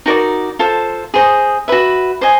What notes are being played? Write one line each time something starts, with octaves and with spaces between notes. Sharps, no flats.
D#4 F#4 A#4 D5
F4 A4 C5
G#4 C5 D#5
F#4 B4 E5
C5 D#5 G#5